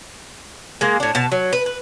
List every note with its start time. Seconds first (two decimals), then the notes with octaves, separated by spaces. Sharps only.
0.81 G#3 A#3
1.00 A2 D4
1.15 B2 A5
1.32 F#3
1.53 B4
1.66 B4